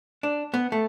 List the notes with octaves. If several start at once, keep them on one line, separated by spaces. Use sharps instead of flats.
D4
B3
A3